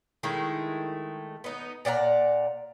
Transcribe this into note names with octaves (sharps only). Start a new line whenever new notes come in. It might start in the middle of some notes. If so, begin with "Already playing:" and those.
D#3 G#3 A3 E4
B3 D#4
A#2 D5 F#5 A#5